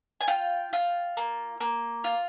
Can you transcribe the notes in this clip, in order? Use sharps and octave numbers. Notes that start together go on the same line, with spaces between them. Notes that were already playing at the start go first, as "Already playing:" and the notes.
G#5
F4 G5
F4
A#3
A#3
F4